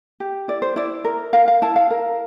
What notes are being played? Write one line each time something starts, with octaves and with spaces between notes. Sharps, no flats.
G4
E4 D5
C5
E4 D5
A#4
A#4 F5
F5
E4 A5
F5
A#4